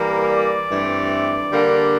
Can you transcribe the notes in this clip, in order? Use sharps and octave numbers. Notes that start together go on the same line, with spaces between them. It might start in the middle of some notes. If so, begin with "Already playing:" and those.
Already playing: E3 G3 A#3 A#4
D5
G2 E3 A3 C4
D3 G3 A#3 D4